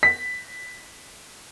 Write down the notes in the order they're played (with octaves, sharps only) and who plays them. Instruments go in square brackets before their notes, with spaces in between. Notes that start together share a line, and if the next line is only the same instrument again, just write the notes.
[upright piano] B6